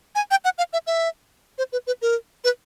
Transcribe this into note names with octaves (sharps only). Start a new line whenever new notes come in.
G#5
G5
F#5
F5
E5
E5
C5
B4
B4
A#4
B4